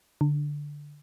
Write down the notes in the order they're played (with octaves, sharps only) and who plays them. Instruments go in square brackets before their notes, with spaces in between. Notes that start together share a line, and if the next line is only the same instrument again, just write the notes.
[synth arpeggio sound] D3